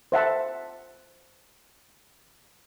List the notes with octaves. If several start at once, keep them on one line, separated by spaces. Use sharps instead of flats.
C5 E5 F#5 A5